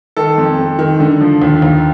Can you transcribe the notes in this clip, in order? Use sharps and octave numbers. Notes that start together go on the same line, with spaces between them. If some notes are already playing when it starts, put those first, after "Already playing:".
D#3 A4
F2
F2
D#3
D3
F3
D#2
D#2